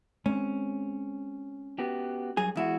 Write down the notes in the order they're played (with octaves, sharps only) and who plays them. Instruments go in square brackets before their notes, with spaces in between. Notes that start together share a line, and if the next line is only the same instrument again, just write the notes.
[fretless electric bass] G#3 C4 [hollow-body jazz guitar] C#4
[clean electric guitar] B3 F#4 G4
[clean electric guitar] G2 F#3 G#5 [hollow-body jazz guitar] G#4
[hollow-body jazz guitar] E2 E4 [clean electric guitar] G#3 F#4